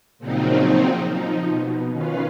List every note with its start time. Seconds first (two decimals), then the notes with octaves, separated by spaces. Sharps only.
0.19 A#2 C#3 F3 F#3 C4 D#4
1.12 F3 D#4
1.48 B2
1.92 D#3 C#4 F4 B4 F5